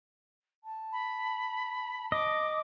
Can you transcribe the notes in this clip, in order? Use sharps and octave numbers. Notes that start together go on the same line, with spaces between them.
A5
B5
D#5 D6